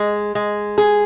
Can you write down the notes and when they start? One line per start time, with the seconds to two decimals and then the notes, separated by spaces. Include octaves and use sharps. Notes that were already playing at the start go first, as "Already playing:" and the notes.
Already playing: G#3
0.35 G#3
0.78 G#4